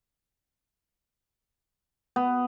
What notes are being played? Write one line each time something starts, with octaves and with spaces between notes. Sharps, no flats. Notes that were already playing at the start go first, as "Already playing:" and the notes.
B3